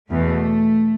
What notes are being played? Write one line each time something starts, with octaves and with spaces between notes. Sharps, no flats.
E2 B2 A3